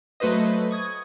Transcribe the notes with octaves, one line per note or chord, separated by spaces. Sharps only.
F#3 A3 F#4 B4 C5 D#5
C#6 D#6 G#6